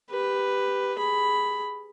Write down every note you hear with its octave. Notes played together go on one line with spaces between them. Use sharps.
G4 B4
G#4 B5